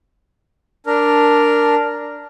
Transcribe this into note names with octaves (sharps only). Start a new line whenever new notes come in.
D4 A#4